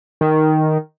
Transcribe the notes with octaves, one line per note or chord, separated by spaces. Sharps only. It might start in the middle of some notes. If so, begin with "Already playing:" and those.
D#3